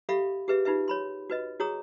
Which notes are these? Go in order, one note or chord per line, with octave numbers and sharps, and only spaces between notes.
G4 A4 E5 F5 B5 C#6
G4 G#4 B4 E5
D#4 F4 G4 B4 E5
C#5 B5 C6
F#4 B4 D#5
F#4 G#4 C#5 A#5 D#6